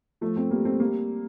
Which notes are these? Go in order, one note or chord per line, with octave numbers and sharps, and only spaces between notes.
F3 A3
A3 C4
G3 A#3
A3 C4
G3 A#3